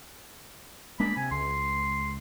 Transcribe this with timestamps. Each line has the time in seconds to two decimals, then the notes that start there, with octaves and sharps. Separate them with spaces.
1.00 G#3 A#3 D4 B5
1.17 C3 G#5
1.31 C#2 C6